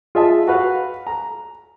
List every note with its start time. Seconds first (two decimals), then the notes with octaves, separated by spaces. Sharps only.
0.15 F4 G#4 D#5 E5 A5
0.47 F#4 B4 F5 F#5
1.07 A#5